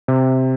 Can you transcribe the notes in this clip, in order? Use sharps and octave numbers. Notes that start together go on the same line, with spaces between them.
C3